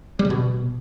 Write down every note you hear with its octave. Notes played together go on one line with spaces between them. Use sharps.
G3
C#3
B2